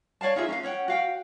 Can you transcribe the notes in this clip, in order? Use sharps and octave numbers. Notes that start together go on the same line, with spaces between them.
C#5 D5 F5 A5
D#4 F4 G#4 E5
C#4 C5 F5
C#4 C#5 F#5 G5
F#4 F5 G5